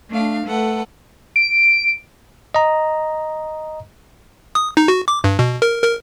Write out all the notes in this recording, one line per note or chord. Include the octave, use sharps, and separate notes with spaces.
A3 D4 F5
A3 A4 B4 F#5
D7
D#5 A#5
D#6
D#4
F#4
D6
G2
B2
A#4
A#4